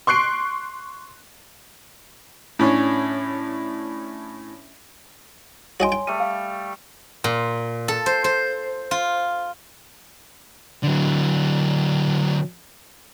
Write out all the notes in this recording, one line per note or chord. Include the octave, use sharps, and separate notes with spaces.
C6 C#6 F#6 C7 D7
A2 C#4 D4
F#4 C#5 D#5 G5 G#5 C6
G5
G3 A3 D#7
F5
A#2
A4
C5
C5
F4
D3 F#3